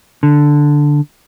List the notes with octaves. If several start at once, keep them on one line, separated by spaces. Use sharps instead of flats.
D3